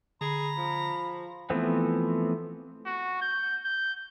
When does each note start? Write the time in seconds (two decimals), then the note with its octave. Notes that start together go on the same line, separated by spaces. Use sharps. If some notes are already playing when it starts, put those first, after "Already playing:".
0.21 D3 G#4 A#5 B5
0.57 F3
1.50 E3 F3 A3 B3 C4
2.86 F#4
3.21 G6
3.65 G6